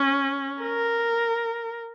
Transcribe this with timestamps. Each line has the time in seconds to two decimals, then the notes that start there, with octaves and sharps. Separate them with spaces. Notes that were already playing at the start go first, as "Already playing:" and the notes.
Already playing: C#4
0.62 A#4